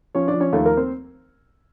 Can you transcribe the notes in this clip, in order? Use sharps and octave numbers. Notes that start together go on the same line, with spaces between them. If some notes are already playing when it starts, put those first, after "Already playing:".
F3 C#4 C#5
D4 D5
F3
C#4 C#5
D#2 A3 A4
A#3 A#4
C4 C5